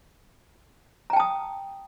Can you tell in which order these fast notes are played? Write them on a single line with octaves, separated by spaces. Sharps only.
A#5 G5 A5 D#6